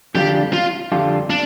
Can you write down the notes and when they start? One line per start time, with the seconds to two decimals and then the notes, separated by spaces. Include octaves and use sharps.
0.15 F2 D3 G3 D4 F4 G4
0.53 F4
0.92 F2 D3 G3 D4 F4
1.30 D4